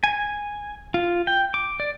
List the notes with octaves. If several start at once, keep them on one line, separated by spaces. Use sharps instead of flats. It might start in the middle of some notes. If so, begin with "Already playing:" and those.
G#5
F4
G5
D6
D5